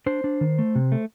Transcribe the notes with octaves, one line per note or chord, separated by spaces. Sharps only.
D4 C5
D4
D#3
A3
C3
A3